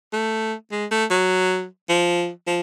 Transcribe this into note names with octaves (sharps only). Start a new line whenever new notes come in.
A3
G#3
A3
F#3
F3
F3